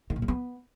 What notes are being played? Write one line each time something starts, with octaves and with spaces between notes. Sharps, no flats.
D#3
A#2
F#3
B3